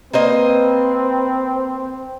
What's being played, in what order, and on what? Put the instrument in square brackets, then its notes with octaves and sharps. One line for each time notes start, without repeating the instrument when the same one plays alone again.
[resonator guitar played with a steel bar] A#3 C5 D#5 [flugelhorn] C4 [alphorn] B4